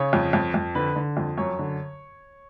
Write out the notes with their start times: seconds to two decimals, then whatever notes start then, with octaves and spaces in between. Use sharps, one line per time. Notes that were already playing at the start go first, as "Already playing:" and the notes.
Already playing: C#3 C#5
0.13 F2
0.33 F2
0.54 F2
0.75 D3 B4
0.96 D3
1.17 F2
1.37 F#2 C#5
1.59 D3